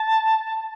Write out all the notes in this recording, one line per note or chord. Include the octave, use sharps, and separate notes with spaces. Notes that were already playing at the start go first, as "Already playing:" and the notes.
Already playing: A5